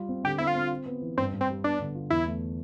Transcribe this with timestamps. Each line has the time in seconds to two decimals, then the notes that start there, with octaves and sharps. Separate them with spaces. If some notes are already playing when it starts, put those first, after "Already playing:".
Already playing: G3 F4
0.09 C4
0.24 D3 G4
0.38 C4 E4
0.47 F4
0.55 C4
0.71 F4
0.86 B3
1.02 E3
1.17 G2 C4
1.33 G2
1.41 C4
1.49 G3
1.64 B3 D4
1.80 D3
1.95 F4
2.10 E2 E4
2.26 A3